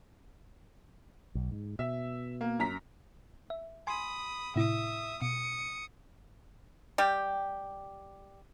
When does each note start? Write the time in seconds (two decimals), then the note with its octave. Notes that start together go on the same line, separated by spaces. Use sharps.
1.35 B1
1.51 G#2
1.79 B2 E5
2.41 A#3
2.59 F#2 A#5 B6
3.50 E5
3.87 G#5 B5 C6 D#6
4.56 A2 C3 E4 E5 D#6
5.22 B2 D#6 C#7
6.98 G3 G4